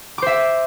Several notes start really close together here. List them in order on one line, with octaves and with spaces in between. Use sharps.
D6 C5 E5